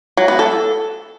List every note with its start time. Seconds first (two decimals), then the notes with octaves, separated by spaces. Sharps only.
0.17 F#3
0.28 B3
0.39 A4